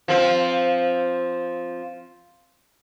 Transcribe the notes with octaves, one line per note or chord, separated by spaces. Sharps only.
F3 C4